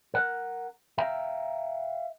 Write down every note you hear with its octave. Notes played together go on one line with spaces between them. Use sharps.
A#4 F#5
E5 F5 G5 A#5